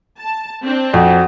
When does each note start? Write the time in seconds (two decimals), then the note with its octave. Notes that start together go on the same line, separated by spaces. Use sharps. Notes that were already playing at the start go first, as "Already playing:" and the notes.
0.19 A5
0.64 C4 D4
0.94 F2 F#4